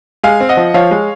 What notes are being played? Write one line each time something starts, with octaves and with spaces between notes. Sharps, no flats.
G#3 F5 G#5
C4
D#5 F#5
F3
F3 C#5 F5
G#3